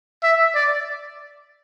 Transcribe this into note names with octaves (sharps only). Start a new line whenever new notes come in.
E5
D5